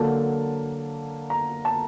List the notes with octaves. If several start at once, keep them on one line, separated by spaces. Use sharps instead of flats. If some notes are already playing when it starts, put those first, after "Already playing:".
Already playing: D3 F#3 A#3 A5
A#5
A5